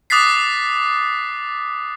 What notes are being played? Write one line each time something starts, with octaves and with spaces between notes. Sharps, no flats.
D6 D#6 F#6 A6 B6 C7